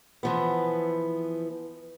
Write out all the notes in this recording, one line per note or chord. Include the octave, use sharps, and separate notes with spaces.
E3 F3 B3